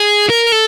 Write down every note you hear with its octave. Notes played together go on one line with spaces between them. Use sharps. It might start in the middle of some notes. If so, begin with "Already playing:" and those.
Already playing: G#4
A#4
A4